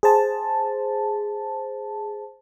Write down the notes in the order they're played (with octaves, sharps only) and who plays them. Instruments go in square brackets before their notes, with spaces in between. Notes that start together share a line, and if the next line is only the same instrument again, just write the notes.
[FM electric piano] G#4 C5 A5